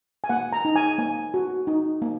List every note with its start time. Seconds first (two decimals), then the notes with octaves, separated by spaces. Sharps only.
0.24 G#5
0.29 A#3 F#5
0.53 A#5
0.65 D#4
0.76 G#5
0.98 A#3 G#5
1.34 F#4
1.67 D#4
2.02 A#3